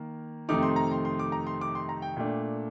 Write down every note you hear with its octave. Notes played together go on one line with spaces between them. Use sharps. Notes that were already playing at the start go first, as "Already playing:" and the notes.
Already playing: D#3 A#3
F2 C3 D#3 A3 D#4 D6
C6
A#5
C6
C6
D6
A#5
C6
D6
C6
A#5
G5
A#2 A3 D4 G5